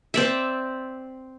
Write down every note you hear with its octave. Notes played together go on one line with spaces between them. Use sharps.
C4 D5 E5